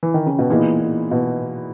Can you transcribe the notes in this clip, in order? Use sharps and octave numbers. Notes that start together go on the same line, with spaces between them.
E3
D#3
C#3
B2
A#2 E3 B3 D#4 G#4
A#2
B2